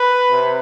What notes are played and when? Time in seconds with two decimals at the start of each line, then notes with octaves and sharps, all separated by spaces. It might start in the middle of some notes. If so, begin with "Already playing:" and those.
Already playing: B4
0.31 C3